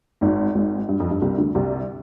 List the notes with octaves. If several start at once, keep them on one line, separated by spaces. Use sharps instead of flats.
G#1 G#2
G#1 G#2
G2
F2
G2
C2 C3
D2 D3
C2 C3